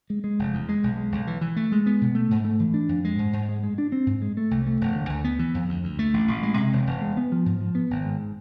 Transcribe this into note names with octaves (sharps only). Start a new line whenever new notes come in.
G#3
G#3
F1
E2
G#3
B1
G#3
B1
E3
E3
A3
G#3
B3
B2
A3
G#2
A3
E3
D4
F2
G#3
G#2
G#2
G#3
G#3
D4
C4
G#2
G#3
A3
C2
A3
E1
D3
D2
B3
E3
F2
D2
D2
A3
A1
A1
G#3
C3
E1
E1
G#3
B3
F3
G#2
F3
B3
G#1
G#2